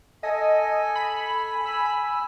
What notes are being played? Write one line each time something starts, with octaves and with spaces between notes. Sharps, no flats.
A4 D#5 G#5
B5
G#5 E6